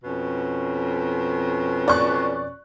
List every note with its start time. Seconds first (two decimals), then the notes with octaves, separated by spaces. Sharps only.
0.04 F2 B2 C#4
1.88 D5 C#6 F#6